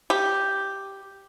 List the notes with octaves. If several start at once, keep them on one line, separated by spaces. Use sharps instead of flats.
G4